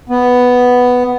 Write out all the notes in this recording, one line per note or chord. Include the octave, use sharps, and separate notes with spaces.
B3